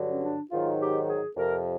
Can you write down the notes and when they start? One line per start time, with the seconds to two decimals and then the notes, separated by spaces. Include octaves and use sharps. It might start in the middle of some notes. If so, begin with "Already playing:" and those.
Already playing: G2 D3 F#3
0.11 C#4
0.23 D4
0.50 G#2 D#3 F#3 F4
0.80 G4
1.08 G#4
1.36 F2 C3 F3 A#4